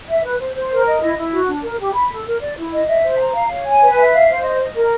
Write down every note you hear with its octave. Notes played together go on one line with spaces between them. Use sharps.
E5
B4
C5
C5
A#4
D#5
E4
E4
F#4
D4
A#4
G4
B5
A4
A#4
D5
E4
D#5
E5
C5
A#5
F5
C#5
G#5
B4
E5
F5
C5
D#5
D#5
A#4